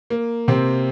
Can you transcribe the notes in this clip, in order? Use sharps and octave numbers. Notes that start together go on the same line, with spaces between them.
A#3
C3 C4